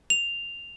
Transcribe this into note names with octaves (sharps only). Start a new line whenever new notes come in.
F7